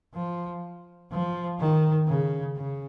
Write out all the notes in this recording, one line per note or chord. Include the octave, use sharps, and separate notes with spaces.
F3
F3
D#3
C#3
C#3